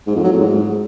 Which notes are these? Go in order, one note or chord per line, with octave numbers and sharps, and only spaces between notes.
G#2
F2
F#3
A2
G#2